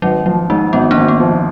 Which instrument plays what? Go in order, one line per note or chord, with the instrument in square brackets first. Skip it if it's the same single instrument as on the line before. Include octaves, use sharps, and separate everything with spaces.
[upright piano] G#1 [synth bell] F#3
[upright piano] F3 [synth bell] F#3
[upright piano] G#2 [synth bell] G#3
[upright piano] G#1 [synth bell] B3
[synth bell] A#3 D4
[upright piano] G#1
[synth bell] B3
[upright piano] F3